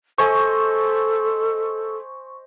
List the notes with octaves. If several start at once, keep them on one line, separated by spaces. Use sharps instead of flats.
A4 C5 D#5 G#5 C#6